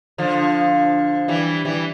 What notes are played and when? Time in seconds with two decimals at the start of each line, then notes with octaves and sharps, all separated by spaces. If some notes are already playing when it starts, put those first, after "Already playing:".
0.18 D3 F3
1.28 E3 G3
1.65 E3 G3